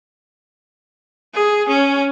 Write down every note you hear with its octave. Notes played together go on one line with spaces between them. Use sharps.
G#4
C#4